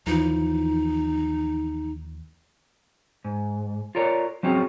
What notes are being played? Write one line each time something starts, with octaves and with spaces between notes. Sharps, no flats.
D#2 E3 F3 D#4
G#2
F4 A4 A#4 C#5 D5
F#3 C4 C#4 F#4 G#4